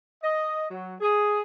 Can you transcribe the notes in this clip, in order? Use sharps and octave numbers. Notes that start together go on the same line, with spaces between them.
D#5
F#3
G#4